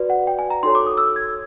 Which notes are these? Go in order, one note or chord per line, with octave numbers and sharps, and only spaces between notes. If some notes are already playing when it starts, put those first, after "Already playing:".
Already playing: F#4 B4 D5
F#5
G5
G#5
A#5
D#4 F#4 A4 C#5 C6
D6
D#6
E6
G#6